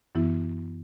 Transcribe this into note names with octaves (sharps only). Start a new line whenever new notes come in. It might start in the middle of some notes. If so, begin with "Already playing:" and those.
F#2 E3 B3 E4